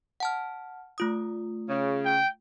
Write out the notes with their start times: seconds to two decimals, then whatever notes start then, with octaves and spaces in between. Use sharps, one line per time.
0.20 F#5 A5 F6
0.98 A3 F4 D#6
1.69 C#3
2.05 G5